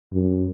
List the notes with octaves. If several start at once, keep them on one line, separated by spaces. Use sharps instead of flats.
F#2